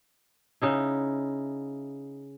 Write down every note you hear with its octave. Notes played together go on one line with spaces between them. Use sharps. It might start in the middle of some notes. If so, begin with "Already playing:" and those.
C#3 D#4 E4